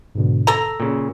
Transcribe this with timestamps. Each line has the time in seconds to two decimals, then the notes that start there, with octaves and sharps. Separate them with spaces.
0.15 G#2 B2 D3
0.47 A4 A#5 E6
0.80 A#2 C#3